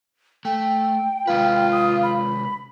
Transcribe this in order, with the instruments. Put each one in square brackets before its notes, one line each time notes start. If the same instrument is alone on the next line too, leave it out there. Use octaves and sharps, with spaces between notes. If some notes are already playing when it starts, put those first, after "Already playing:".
[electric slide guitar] A3 [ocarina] G5
[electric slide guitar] C3 G#3 B4 [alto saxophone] F4
[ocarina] D#6
B5